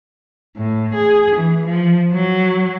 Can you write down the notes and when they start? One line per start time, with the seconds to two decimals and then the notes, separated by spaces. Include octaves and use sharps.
0.57 A2
0.94 G#4
1.36 E3
1.66 F3
2.13 F#3